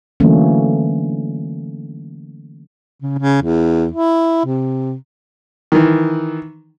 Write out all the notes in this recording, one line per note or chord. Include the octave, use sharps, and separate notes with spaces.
D3 E3 F#3 A3 A#3 C#4
C#3
C#3
E2
E4
C3
D#3 E3